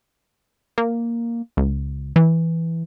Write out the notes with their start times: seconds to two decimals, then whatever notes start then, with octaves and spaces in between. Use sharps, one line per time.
0.78 A#3
1.57 C#2
2.16 E3